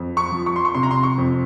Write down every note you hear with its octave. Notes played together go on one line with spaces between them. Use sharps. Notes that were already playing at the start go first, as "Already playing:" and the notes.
Already playing: F2
C#6
F3
C#6
C6
C#6
C3 C6
A#5
C6
C#6
F2